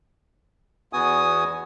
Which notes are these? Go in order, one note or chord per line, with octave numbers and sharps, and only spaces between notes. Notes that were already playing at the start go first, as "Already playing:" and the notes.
E2 B3 F#4 G#5 D#6